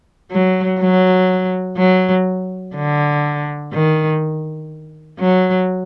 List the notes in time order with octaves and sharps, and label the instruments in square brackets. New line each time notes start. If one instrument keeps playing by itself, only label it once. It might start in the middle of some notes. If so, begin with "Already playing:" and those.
[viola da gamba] F#3
F#3
F#3
D3
D#3
F#3